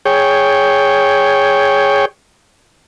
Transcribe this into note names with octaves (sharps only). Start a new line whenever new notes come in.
G#4 C#5 G5